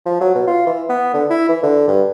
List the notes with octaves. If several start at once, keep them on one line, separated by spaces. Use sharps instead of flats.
F3
F#3
B2
F4
E3
B3
D3
E4
E3
D3
G2